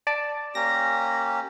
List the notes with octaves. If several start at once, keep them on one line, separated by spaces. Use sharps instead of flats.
D5 A5
A#3 C#4 G4 A#6